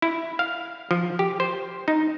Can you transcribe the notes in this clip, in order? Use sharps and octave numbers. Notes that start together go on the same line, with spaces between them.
E4
F5
F3
G4
C5
D#4